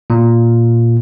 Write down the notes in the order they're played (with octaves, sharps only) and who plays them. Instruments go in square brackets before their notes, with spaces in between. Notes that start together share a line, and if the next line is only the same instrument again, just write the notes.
[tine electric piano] A#2